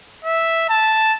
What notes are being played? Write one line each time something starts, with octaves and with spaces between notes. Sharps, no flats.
E5
A5